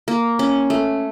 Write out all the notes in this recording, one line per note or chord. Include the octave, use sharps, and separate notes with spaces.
A#3
C#4
A3